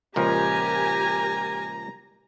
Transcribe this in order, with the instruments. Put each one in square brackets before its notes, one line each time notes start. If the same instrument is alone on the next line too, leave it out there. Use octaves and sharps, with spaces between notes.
[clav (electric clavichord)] C#2 A#2 F3 [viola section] G4 A#4 G#5 [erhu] A#5